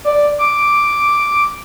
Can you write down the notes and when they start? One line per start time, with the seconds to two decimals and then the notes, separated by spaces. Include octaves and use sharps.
0.05 D5
0.39 D6